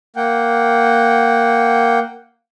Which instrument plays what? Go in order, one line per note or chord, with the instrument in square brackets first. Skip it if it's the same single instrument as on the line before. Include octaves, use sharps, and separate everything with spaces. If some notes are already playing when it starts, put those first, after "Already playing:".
[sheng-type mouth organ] A#3 F#5 G5